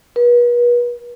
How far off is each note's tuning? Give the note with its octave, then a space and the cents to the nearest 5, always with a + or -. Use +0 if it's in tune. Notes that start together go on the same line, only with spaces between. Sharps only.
B4 -40